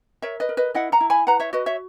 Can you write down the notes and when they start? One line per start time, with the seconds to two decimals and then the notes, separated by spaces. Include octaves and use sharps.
0.22 A#4 C#5 E5
0.40 B4 D#5
0.49 A#4
0.57 B4 D#5
0.75 E4 D#5 F#5
0.92 F#5 A#5
1.01 E4
1.10 G#5 B5
1.27 B4 F#5 A#5
1.40 C#5 E5
1.53 F#4 B4 D#5
1.66 C#5 E5